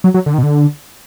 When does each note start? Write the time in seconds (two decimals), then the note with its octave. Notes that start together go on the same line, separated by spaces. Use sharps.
0.04 F#3
0.14 F#3
0.26 D3
0.34 D#3
0.38 B2
0.43 D3